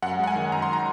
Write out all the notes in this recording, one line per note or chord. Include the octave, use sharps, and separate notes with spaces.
F#2 F#5
G#3 F#5
G#5
D#3
F#2 A#5
C6
A#5